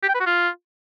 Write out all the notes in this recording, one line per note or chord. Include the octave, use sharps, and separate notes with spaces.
G4
G5
B4
F#4
F4